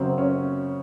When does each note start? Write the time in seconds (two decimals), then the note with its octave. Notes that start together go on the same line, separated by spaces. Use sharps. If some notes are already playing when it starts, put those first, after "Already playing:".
Already playing: F#2 C#3 F#3 C4
0.18 C#4